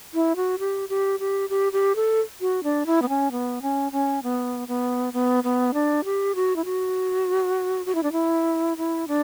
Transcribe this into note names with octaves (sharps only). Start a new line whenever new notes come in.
E4
F#4
G4
G4
G4
G4
G4
A4
F#4
D4
E4
B3
C#4
B3
C#4
C#4
B3
B3
B3
B3
D4
G4
F#4
E4
F#4
F#4
E4
D4
E4
E4
D4